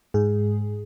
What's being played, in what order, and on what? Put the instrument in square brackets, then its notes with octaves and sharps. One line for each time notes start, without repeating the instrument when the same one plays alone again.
[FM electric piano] G#2 G#4